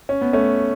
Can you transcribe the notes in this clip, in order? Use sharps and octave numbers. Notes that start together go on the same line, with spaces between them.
C#4
B3
A3 C#4